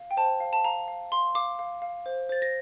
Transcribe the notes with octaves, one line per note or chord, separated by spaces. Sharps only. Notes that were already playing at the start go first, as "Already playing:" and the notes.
Already playing: F5
G5
C5 A5
F5
A5
F5 A#5
F5
F5 C6
F5 D6
F5
F5
C5
C5 A6
A#6